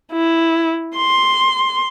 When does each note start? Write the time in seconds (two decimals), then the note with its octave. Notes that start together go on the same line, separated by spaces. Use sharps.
0.12 E4
0.96 C6